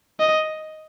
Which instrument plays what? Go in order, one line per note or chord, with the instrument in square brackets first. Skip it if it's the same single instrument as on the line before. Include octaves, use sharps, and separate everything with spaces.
[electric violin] D#5